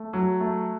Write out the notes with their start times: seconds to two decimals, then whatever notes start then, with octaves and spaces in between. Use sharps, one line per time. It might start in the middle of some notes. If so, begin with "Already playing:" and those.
Already playing: A3
0.13 F#3
0.40 A3